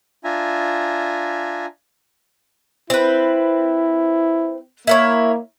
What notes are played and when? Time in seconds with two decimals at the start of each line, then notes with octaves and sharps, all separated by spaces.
0.24 D4 F4 E5 G#5 A#5
2.90 C4 E4 B4
4.87 A#3 E4 A#4 C#5